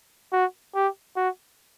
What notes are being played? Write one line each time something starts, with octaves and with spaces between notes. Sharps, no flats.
F#4
G4
F#4